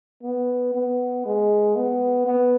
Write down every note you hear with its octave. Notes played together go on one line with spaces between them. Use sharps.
B3
B3
G#3
B3
B3